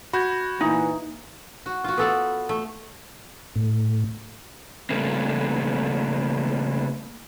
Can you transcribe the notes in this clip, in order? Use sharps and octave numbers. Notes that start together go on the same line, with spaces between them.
F#4 B5 G6 G#6
A#2 E3 D#4
F#4
F4 F#4
B3 A4 D5
A3
A2
C#3 G3 A3 A#3 C4